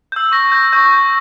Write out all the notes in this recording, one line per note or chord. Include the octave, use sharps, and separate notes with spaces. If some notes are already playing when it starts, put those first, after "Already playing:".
E6 G6
C#6 A#6
G6
C#6 G6
G6